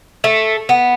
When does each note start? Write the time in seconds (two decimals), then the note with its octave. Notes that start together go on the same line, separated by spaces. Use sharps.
0.24 A3
0.69 B3